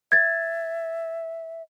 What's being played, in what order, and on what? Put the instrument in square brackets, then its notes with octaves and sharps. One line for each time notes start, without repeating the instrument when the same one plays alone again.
[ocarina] E5 [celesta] G#6 A6